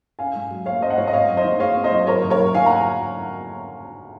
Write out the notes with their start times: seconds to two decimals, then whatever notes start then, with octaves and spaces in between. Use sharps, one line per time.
0.19 C#4 F5 G#5
0.36 G#2
0.51 F#3
0.66 A#3 C#5 F5
0.81 C#4 C5 D#5
0.90 F#5
0.98 G#2 C#5 F5
1.08 D#5
1.13 C4 C#5 F5
1.29 F#2
1.37 C5 D#5
1.44 D#3
1.60 G#3 C#5 F5
1.76 C4
1.84 C5 D#5
1.91 F#2
2.07 F#3 A#4 C#5
2.24 F#1
2.30 A#4 C#5
2.39 F#2
2.54 D#3 F5 G#5
2.66 F#5 A#5
2.71 F#3